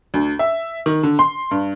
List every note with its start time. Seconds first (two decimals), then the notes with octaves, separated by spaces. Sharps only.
0.14 D2
0.39 E5
0.86 D#3
1.03 D3
1.19 C6
1.51 G2